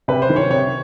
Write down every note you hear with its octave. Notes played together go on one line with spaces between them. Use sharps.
C3 B4
C5
D#3
C#5
C3 C#5